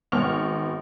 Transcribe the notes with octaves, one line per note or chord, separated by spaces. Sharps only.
G#1 B3 C#6 F6 F7